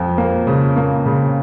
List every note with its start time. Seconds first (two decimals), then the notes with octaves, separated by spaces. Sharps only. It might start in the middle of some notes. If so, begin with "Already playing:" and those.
Already playing: F2 F3
0.18 A#3
0.47 C#3
0.76 A#3
1.06 C#3